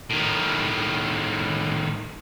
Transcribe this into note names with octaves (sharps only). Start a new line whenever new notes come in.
A2 D#3